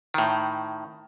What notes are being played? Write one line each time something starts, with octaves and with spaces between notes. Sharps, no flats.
A2 D#3